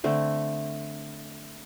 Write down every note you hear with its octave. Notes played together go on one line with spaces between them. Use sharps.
D3 A3 C4